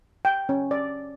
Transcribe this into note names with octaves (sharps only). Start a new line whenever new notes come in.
G5
C#4
D5